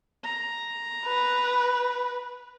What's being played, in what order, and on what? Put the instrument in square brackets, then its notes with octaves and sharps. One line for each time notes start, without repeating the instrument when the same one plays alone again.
[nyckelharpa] A#5
[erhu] B4